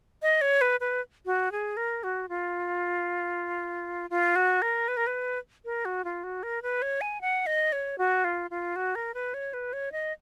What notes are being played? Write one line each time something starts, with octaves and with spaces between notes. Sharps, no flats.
D#5
C#5
B4
B4
F#4
G#4
A#4
F#4
F4
F4
F#4
A#4
B4
A#4
B4
A#4
F#4
F4
F#4
A#4
B4
C#5
G#5
F#5
D#5
C#5
F#4
F4
F4
F#4
A#4
B4
C#5
B4
C#5
D#5